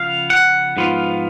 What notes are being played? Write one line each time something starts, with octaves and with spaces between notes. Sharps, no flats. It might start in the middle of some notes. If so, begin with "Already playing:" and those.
Already playing: C#3 F3 B3 F5
F#5
G#2 F3 B3 F4